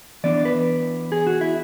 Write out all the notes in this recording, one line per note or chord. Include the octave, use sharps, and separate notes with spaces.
E3 B3 D4 D5
B4
G#4
F#4
E4